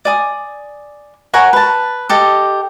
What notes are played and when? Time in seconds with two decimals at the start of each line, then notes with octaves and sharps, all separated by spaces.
0.05 D5 G#5 D#6
1.33 A#4 C#5 F#5 G#5
1.53 B4 A5
2.09 G4 A4 D#5